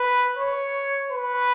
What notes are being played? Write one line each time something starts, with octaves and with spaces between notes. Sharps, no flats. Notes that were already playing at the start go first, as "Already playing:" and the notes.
Already playing: B4
C#5
B4